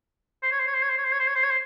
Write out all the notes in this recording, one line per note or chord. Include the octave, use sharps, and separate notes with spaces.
C5
C#5
C5
C#5
C5
C#5
C5
C#5
C5
C#5
C5
C#5
C5
C#5
C5